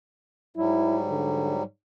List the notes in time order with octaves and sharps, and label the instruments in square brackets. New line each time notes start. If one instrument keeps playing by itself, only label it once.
[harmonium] G#2 F#3 G3 [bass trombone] E4
[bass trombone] D3